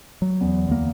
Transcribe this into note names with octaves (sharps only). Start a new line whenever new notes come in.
F#3
E2
D2 A#3